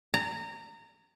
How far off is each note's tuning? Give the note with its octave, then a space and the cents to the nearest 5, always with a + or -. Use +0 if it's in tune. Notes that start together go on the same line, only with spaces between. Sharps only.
A#5 -25